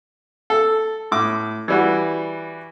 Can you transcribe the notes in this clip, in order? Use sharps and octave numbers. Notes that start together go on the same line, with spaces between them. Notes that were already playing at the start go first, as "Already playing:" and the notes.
A4
A2 D6
E3 G3 F#4